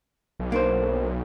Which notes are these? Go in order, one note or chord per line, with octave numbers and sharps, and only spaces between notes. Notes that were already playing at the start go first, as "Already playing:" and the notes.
B1
A#3 D4 C5